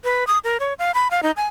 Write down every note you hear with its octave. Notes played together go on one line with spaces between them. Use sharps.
B4
D#6
A#4
C#5
F5
B5
F5
D#4
G#5